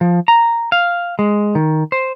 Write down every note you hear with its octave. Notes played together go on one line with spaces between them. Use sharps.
F3
A#5
F5
G#3
D#3
C5